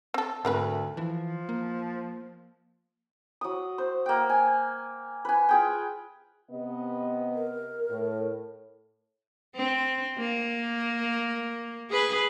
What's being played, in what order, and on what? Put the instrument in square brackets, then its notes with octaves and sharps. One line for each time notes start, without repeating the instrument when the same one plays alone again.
[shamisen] C4 A4
[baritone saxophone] D2 [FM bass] G#2 [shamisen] C4 A#4 B4
[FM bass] E3 [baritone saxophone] F3
[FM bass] A#3
[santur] F#3 D#6
C5
A#3 G5
G#5
B4 G#5
F4 G#4 G5
[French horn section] C3 B3 D#5
[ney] A#4
[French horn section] A2
[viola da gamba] C4
A#3
G#4 B4